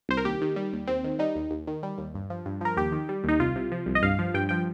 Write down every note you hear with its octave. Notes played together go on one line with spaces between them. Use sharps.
C2 C5
A#4
D#2 G4
D#3
G3
D#2
D#2 C4
D#3
G3 D#4
D#2
D#2
D#3
G3
D#2
G2
F3
G2
F3 A#4
D#2 G4
D#3
G3
D#2 D#4
C2 F4
C3
F3
C2
D#5
G2 F5
F3
G2 G5
F3 G5